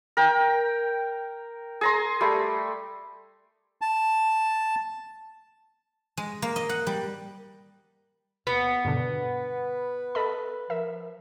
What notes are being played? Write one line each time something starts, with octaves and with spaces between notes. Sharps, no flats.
A#4 G5
G#4 A#5 C6
G3 A3
A5
G#3
A#3
D#5
F#5
G3
D#2 B3
G2 B2 D3 B4
A4 D#5 B5
F3 A#4 E5